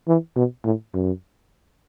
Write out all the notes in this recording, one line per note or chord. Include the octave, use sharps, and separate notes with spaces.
E3
B2
A2
F#2